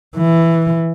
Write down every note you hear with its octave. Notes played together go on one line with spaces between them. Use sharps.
E3